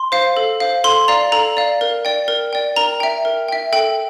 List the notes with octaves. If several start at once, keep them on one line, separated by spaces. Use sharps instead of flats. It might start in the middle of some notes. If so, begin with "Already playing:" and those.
Already playing: C6
C5 F5
A4
C5 F5
A4 C6
D5 F5 A#5
A4 A#5
D5 F5
A#4
D5 G5
A#4
D5 G5
A#4 A#5
E5 G5
A#4
E5 G5
A4 G5